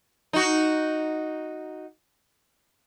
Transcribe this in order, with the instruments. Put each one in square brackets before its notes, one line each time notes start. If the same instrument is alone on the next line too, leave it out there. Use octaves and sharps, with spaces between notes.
[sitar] D#4 F#4